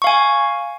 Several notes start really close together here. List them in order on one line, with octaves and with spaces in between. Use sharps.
C#6 F5 G#5